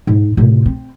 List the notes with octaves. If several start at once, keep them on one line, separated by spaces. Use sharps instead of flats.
G#2
A2 C3
C4